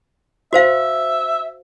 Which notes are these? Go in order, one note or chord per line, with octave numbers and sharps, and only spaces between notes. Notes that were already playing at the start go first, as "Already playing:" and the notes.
F#4 C5 E5 F5